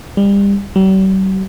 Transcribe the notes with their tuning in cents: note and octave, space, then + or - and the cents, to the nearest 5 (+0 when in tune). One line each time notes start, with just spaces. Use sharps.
G3 +30
G3 -45